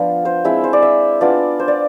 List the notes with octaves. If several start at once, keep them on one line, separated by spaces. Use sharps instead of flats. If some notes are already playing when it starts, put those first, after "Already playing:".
Already playing: F3 B3 D4 D5 F5
C5
G#3 C4 E4 E5
C5
D5
E5
B3 D4 F4 D5
C5
D5